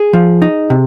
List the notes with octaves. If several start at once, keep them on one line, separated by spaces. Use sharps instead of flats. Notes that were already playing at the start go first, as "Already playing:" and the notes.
Already playing: G#4
F3
D#4
C3